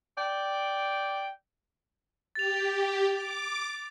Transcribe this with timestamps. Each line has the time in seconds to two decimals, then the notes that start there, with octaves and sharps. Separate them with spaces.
0.18 D5 G5
2.35 G4 A6 F7
3.10 D6